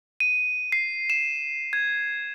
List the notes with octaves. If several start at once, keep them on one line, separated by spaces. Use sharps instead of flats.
D#7
C7
E7
G#6